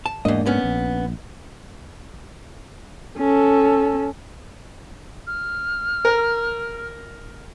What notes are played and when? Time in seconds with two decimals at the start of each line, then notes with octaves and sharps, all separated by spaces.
0.06 A5
0.25 E2 G#2 A#3 D4 D#5
0.46 B3 C#4
0.64 A#1
3.18 C#4 A4
5.27 F6
6.05 A#4